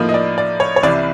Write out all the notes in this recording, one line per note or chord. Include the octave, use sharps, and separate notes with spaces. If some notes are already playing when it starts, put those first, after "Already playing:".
Already playing: A2 F3 A#3 D#4
D#5
D5
D5
C#5
C#5
C2 C3 E3 D5